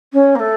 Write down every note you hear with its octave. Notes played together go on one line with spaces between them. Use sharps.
C#4
A#3
A3